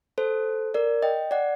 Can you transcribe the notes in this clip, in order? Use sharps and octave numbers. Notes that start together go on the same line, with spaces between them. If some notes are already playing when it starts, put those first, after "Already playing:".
A4 C5
A#4 D5
D#5 G5
D5 F#5